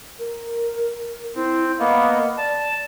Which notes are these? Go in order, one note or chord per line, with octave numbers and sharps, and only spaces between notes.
A#4
C4 E4
A#3 B3 D#5
D5 A5